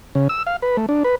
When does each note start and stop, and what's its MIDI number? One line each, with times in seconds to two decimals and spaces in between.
0.15 0.28 49
0.29 0.43 88
0.47 0.56 77
0.62 0.77 71
0.77 0.86 57
0.89 1.03 62
1.04 1.15 71